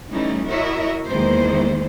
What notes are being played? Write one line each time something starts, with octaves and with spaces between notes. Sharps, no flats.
E3 G3 A3 C#4 D#4 E4
E4 F#4 A#4 C#5 D#5 E5
E2 D#3 G#3 A#3 E4 C5